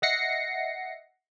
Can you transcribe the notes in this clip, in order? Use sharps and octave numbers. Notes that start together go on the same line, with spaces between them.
D#5 E5 F#5 A#6 C7 C#7